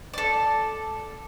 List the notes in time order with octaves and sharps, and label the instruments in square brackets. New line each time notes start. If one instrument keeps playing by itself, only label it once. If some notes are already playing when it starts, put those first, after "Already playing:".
[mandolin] A4 D5